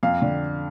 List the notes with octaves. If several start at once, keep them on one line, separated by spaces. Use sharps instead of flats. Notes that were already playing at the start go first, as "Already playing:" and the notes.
F2 F5
D3